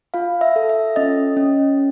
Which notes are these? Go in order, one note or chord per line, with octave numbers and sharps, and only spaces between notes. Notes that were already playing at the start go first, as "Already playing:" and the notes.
F4 F5
E5
A4
E5
C#4 D#5
C#4